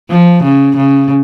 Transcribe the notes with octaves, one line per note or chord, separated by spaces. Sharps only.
F3
C#3
C#3